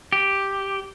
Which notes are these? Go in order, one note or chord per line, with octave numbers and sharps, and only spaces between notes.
G4